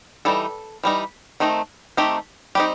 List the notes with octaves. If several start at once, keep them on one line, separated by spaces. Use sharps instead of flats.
E3 G3 D#4 A4
E3 G3 D#4
D#3 A3 C4 D#4
D#3 A3 C4 D#4 G4
G3 C4 D#4 G4